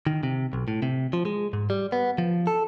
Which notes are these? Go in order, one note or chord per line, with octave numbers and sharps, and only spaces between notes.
D#3
C3
B1
A2
C3
F3
G#3
G#2
G3
B3
F3
A4